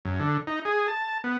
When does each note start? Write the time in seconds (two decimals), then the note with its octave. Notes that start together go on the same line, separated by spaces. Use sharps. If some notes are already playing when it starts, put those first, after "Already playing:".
0.05 F#2
0.20 D3
0.47 D#4
0.65 G#4
0.88 A5
1.24 B3